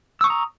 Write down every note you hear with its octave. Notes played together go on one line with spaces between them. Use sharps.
A#5 C#6 D#6 E6